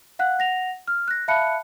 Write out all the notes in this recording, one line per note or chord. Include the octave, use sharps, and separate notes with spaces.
F5 F#5 F#6
F#5 A#6 F7
F6
F#6 A#6
E5 F5 A5 B5 F#6 C#7